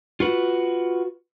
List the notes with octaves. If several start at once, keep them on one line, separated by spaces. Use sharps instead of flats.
F4 F#4 B4